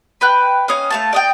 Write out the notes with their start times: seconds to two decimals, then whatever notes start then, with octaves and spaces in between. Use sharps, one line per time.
0.21 B4 G5 F#6
0.68 C#4 D#5 F5
0.91 A3 F5 A5
1.13 D5 D#5 G5